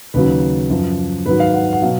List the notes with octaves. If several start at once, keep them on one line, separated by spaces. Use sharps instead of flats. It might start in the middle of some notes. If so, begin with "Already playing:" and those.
D#2 C#3 F#3 B4
F#2 F3
G#2 D#3 F#3 B4
F5
F#5
F#5
B2 F#3 F5